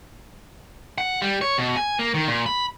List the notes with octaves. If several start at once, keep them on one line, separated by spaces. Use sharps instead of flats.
F#5
G3
C#5
B2
G#5
A#3
D#3
A#2
B5